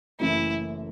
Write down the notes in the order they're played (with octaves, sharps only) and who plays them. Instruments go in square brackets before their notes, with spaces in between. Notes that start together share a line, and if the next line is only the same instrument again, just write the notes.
[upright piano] F#1 F#2 E3 A3 [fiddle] E4